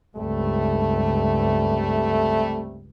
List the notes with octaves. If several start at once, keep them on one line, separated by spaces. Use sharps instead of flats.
C#2 G2 C3 G3 A3